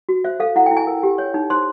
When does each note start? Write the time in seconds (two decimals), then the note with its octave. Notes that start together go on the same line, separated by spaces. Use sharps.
0.09 F#4
0.24 C5 E5
0.40 A4 F5
0.56 E4 F#5
0.66 G5
0.71 E4
0.77 G#5
0.87 A#4
1.03 G4
1.18 C#5
1.34 D#4
1.50 C5 C6